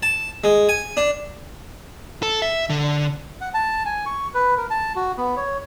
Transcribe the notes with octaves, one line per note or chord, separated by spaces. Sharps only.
A5
G#3
G#5
D4
A4
E5
D3
F#5
A5
G#5
C#6
B4
A#4
A5
F#4
B3
C#5